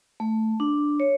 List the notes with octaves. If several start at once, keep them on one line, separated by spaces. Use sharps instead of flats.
A3
D4
C#5